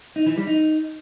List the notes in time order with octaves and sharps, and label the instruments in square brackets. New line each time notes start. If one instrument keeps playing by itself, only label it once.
[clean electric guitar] D#4
E3
G3
D#4